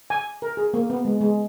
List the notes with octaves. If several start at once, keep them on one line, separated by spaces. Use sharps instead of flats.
G#5
A#4
G#4
A#3
B3
G#3
G#3